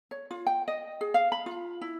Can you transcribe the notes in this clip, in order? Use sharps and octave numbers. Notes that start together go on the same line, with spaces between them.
C#5
F4
G5
D#5
G#4
F5
B5
F4
E4